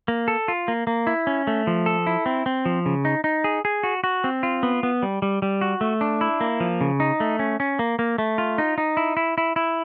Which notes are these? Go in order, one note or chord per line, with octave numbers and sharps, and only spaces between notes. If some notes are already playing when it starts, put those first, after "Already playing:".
A#3
A4
F4
A#3
A#3
E4
C#4
A3
F3
A4
E4
C4
C4
F3
C#3
D#4
D#4
G#4
G#4
F#4
F#4
C4
F4
B3
B3
G3
G3
G3
F#4
A3
D4
E4
A#3
F3
C#3
D#4
A3
C#4
C#4
A#3
A#3
A3
F4
D#4
D#4
E4
E4
E4
E4